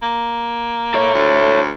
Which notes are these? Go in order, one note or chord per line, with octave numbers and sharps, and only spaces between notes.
A#3
A4 C#5
D2